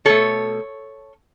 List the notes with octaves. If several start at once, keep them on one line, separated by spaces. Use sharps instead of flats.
B2 A3 A4 C#5